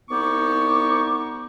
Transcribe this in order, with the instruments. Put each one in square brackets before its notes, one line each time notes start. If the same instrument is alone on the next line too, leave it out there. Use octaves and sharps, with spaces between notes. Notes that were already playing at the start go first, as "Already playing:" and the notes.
[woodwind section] C2 B3 D#4 C#6 D6